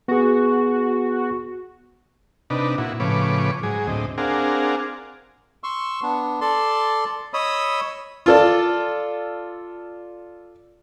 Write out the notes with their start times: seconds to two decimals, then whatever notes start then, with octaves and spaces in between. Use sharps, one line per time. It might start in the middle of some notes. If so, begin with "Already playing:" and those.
0.08 B3 F#4 G#4
2.50 C3 D4 D#4 B4
2.78 A#2 E4 F#4
3.00 A2 C#3 F3 B4 C#5 D6
3.63 G#2 F#3 G#4
3.87 D2 A2 C4 D#5
4.18 C4 D4 G#4 A#4 F5 F#5
5.63 C6 C#6 E6
6.02 B3 D4
6.41 A4 D5 A5 C6
7.34 C#5 D#5 B5 D#6 E6
8.26 F4 A4 D5